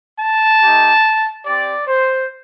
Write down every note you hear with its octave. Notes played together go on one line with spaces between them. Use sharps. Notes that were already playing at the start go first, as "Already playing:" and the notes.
A5
A3 D#4 G4
C4 G4 D5
C5